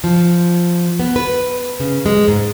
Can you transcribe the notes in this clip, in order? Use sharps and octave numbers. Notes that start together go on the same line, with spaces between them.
F3
B3
B4
C#3
G#3
G#2